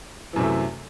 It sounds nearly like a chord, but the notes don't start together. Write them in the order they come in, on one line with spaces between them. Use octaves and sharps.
E3 F#2 C3 A3